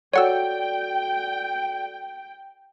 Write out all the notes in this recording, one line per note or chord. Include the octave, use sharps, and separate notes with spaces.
F#4 A4 C#5 D5 F#5 G5 E6